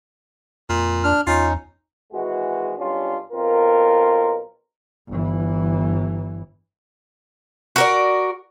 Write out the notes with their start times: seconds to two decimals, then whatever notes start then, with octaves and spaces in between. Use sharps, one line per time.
0.69 F2 A#2
1.04 D4 F6
1.27 E2 C#4 D#4 F4
2.13 G#1 E3 G#3 F#4
2.79 B1 G3 C#4 D4 F4
3.33 B1 C4 F4 A#4
5.08 G1 E3
7.76 F#4 A#4 D5